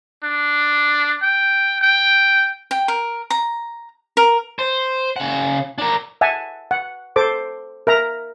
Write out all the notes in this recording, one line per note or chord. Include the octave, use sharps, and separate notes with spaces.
D4
G5
G5
G5
A#4
A#5
A#4
C5
C#3 F#5
D4 A#4
E5 F#5 G#5 A5
F#5
A4 C5 D6
A#4 E5 A#5